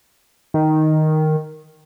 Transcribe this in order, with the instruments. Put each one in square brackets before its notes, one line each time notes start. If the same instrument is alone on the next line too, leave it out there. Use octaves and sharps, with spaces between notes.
[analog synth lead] D#3